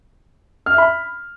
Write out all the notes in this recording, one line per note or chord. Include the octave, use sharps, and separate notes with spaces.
F6
E5
B5